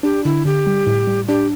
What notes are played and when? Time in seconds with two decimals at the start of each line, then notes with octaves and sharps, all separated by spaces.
0.03 D4 G4
0.25 D3 E4
0.45 D3 G4
0.67 G3
0.87 A2
1.07 G3
1.28 D4 G4